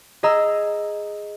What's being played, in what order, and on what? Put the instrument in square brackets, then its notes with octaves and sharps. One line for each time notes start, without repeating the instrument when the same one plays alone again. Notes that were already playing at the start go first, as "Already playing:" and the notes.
[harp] G#4 D#5 A#5 E6